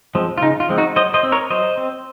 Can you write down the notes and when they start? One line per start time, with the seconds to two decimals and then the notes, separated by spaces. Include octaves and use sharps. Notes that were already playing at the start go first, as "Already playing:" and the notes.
0.15 F3 G#3 C4
0.38 F4
0.42 C#3 D#4
0.60 F4
0.69 F3 G#3 C4
0.78 D#4 F#4
0.96 F#3 C5 D#5
1.14 C5 D#5
1.23 C4
1.32 A#4 C#5
1.50 F#3 C5 D#5
1.77 C4